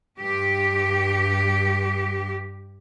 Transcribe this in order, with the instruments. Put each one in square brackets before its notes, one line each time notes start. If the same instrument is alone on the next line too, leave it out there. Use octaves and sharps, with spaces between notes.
[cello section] G2 G4